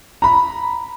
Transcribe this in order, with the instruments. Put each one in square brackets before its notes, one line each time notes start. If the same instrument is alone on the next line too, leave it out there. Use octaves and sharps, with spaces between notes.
[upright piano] A#5 B5